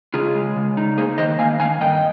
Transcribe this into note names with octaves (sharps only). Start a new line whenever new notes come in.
C#3 F4 G#4
G#3
C#3
D#4
A#3 G#4 C5
D#3 C5 D#5
A#3 F5 G#5
D#3 F5 G#5
G2 D#5 G5